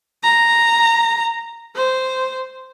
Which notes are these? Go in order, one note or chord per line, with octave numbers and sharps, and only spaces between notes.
A#5
C5